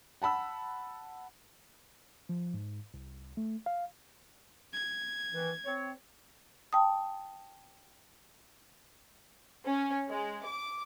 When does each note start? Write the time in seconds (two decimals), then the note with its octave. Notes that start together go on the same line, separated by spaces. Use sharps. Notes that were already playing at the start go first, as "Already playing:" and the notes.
0.22 F#5 A5 B5 E6
2.29 F3
2.54 G#2
2.94 C2
3.37 A3
3.66 F5
4.73 G#6
5.31 D#3 E3
5.65 C4 C#5
6.73 G5 A5 D#6
9.66 C#4
10.09 G#3
10.43 D6